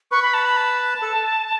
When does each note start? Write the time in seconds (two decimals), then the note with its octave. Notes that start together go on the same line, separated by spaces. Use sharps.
0.11 B4 C#6
0.22 B5
0.34 A5
0.45 B5
0.57 A5
1.02 A4